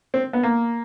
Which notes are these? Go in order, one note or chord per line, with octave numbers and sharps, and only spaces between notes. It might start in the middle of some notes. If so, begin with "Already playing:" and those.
C4
B3
A#3